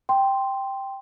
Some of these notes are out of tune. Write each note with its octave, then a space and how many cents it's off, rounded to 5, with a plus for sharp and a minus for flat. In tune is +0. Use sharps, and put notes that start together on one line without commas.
G5 +0 C6 +0